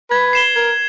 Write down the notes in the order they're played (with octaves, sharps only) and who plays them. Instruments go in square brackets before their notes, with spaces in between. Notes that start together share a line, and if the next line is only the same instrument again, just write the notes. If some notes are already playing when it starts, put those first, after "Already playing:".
[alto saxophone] B4 [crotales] G#6
[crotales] C7 E7 G7
[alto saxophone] A#4 [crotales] G#6